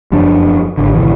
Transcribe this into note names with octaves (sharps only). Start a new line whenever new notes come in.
F1 F#2 F3 D4
G#1 D3
G#1 C#2 B2 E3